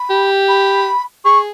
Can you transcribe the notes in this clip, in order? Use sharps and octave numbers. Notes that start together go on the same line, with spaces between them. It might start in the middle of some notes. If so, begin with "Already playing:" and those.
Already playing: B5
G4
B5
G#4 C#6